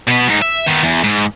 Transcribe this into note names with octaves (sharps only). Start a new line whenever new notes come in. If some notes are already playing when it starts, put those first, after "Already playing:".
B2 B3
G#2 D#4
E5
D#3 B3
E2
G#2